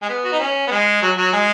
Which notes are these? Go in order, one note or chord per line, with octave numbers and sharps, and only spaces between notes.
G#3
B3
F#4
D#4
C#4
B3
G#3
F#3
F#3
G#3